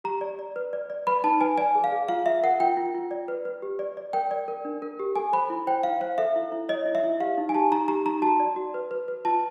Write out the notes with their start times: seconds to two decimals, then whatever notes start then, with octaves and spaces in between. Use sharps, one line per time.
0.04 G4 A#5
0.21 D5
0.39 D5
0.56 B4
0.73 D5
0.90 D5
1.07 B4 B5
1.24 D#4 A5
1.41 B4 G#5
1.58 D5 G#5
1.75 G#4
1.84 F5
1.92 G#4
2.09 F4 F5
2.26 F4 E5
2.43 A#4 F#5
2.60 F4 G5
2.77 F4
2.94 F4
3.11 D5
3.28 B4
3.45 B4
3.62 G4
3.79 D5
3.97 D5
4.13 A#4 G5
4.31 D5
4.48 A#4
4.65 D4
4.82 A#4
4.99 G4
5.16 A4 G#5
5.33 C5 B5
5.50 E4
5.67 C5 G5
5.83 E4 F5
6.01 C5 F5
6.18 A4 E5
6.36 E4
6.52 E4
6.69 C#5 D#5
6.86 E4
6.95 E5
7.04 E4
7.20 G4 F5
7.38 D#4
7.49 G#5
7.54 G4 A5
7.72 D#4 A#5
7.88 G4 A#5
8.06 D#4 A#5
8.22 F#4 A5
8.40 D5
8.56 F#4
8.74 B4
8.91 B4
9.08 B4
9.25 F4 A5